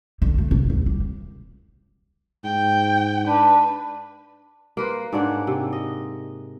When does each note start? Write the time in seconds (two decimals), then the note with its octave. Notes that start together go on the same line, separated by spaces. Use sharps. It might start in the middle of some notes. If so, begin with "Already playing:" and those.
0.22 D3
0.38 A3
0.51 C2
0.70 D#2
0.86 G3
2.44 G#2 G5
3.27 D4 B4
4.77 A#3 B4 C5
5.13 G#2 D4 C#5 F#5
5.47 C3
5.72 D#5